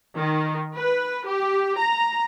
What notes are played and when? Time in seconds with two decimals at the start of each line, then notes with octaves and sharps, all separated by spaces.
0.16 D#3
0.74 B4
1.26 G4
1.77 A#5